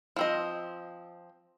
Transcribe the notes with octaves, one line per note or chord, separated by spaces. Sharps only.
F3 C4 D#5